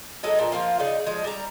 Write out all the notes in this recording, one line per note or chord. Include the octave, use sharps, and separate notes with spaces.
F#3 G#3 D#4 A4
A#2
F3 A#3 F4
C#3 D#4 D5
F3 G#3
G3 A#5